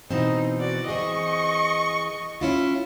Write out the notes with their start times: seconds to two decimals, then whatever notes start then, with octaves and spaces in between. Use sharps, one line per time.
0.11 B2 E3 C4 D#4
0.59 F#4 D5
0.88 E3 C4 G#4 D#5 C#6
2.41 C#4 E4 F4